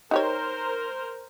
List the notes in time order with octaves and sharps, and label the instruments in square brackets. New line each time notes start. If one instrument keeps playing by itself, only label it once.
[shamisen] D#4 G4 C#5 [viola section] A#4 C5